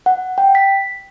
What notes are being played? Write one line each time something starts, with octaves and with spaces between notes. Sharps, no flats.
F#5
G5
B6